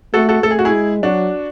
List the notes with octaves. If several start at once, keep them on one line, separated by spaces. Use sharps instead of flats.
A3 F#4 A4
F#4 A4
A3 A4
G#4
F#4
E4 G#4
G#3
F#3 D4 F#4